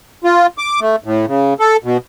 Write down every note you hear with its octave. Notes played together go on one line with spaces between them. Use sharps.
F4
D6
A3
A2
C#3
A4
B2